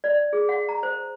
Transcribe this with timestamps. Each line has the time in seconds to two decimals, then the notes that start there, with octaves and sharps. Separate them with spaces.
0.04 D5
0.33 G#4
0.49 F#5
0.69 A#5
0.83 C5